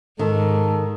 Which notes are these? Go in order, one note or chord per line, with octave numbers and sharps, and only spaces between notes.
G#2 D#3 A4